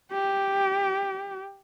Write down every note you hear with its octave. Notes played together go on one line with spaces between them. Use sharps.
G4